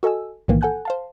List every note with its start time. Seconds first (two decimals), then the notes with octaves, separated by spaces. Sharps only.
0.03 F#4 A4 D#5 G#5 E6
0.48 B1 A2 D#3 E3 A#3
0.61 A4 F#5 G#5 F#6 G6
0.85 C5 F5 A5